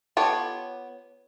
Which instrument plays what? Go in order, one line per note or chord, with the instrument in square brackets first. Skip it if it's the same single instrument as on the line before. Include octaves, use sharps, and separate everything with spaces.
[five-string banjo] B3 C#5 [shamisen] F4 G4 A4